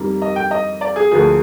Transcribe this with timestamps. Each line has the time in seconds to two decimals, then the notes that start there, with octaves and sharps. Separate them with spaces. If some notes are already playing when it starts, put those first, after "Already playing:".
Already playing: F2 D#3 G3 A#3
0.22 D#5
0.36 G5
0.51 D#5
0.81 D5
0.96 G#4
1.12 D2 D3 F3 A#3 G#4